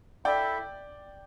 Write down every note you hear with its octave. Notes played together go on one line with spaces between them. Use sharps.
E4 A4 D5 E5 G5